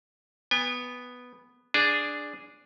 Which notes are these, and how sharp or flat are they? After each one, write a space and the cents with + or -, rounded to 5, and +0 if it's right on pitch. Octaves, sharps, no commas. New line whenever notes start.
B3 +0 G#5 -45
D4 +0 G#4 -5